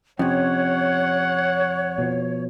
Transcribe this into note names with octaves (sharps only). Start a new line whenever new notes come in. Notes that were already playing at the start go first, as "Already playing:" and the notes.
F2 C3 C#4 C#5 F#5
B2 F3